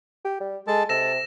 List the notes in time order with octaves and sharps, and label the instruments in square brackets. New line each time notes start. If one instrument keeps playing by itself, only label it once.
[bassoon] G4
G3
[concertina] G#3 A5 [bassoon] A4
[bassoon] C3 [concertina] A4 [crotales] A#6 E7